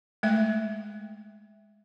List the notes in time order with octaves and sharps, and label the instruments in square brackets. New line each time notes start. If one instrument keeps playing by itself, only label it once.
[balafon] G#3 A3 E5